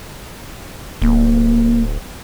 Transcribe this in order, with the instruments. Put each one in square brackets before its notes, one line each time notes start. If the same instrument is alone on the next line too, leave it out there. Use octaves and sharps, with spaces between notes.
[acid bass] D1 [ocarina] A#3